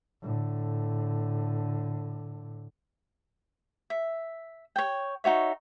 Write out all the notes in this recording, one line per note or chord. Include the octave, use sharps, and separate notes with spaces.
A2 D3
E5
C#5 G5
D#4 F#4 C#5 E5